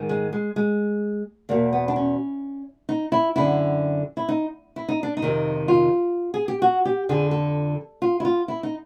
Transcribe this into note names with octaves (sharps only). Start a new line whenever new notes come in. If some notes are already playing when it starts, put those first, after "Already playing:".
Already playing: G#2 D#3
G#3
G#3
G#3
E2 B2 A#3
B3
D4
C#4
D#4
E4
F#2 D3 E4
E4
D#4
E4
D#4
D4
D#4
F2 C3 D#3
F4
G#4
G4
F#4
G4
F2 D3 G#4
A4
F4
E4
F4
E4
D#4